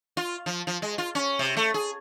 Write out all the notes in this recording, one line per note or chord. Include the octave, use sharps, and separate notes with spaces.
F4
F3
F3
G#3
F4
C#4
C3
A3
G#4